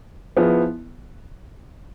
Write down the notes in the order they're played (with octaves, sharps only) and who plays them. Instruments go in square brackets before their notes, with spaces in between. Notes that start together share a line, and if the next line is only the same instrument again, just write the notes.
[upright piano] F3 B3 E4 G#4